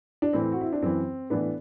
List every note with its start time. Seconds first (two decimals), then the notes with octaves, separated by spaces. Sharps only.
0.22 D4
0.33 A2 E3 C4
0.52 F#4
0.61 E4
0.72 D4
0.81 F#2 E3 C4
1.30 A2 E3 B3 D4